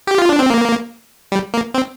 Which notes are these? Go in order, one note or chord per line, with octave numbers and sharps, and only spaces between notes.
G4
F4
D4
C4
A#3
G3
A#3
C4